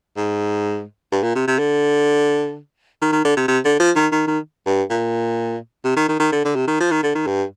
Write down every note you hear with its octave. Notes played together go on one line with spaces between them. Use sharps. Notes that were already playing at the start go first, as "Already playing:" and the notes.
G#2
G2
A#2
C3
C3
D3
D#3
D#3
D3
C3
C3
D3
F3
D#3
D#3
D#3
G2
A#2
C3
D#3
D#3
D#3
D3
D3
C3
D#3
F3
D#3
D3
D#3
G2